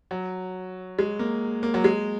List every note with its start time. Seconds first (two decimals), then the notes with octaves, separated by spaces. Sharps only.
0.11 F#3
0.99 G#3
1.19 A#3
1.63 A#3
1.74 F#3
1.84 G#3